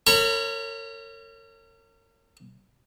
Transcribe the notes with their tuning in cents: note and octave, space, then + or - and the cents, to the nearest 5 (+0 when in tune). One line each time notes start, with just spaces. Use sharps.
A#4 -40 C#5 -5 B5 +0